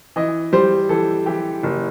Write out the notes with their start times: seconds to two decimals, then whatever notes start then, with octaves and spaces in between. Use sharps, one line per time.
0.16 E3 D#5
0.53 G3 C5
0.89 E3 A4
1.26 E3 G4
1.63 F#1